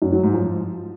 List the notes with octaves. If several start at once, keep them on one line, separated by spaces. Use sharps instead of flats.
F#2
F#3
G#2
F3